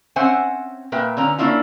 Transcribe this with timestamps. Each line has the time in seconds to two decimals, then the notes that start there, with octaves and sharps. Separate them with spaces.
0.16 C4 C#4 C5 E5 F#5 G#5
0.92 A#2 A#3 B4 E5 G5
1.17 D3 F3 C#4 A#5
1.38 A#3 C#4 D4 E4 F4